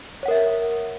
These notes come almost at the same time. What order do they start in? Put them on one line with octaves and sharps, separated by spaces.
C#5 F#5 A#4 E5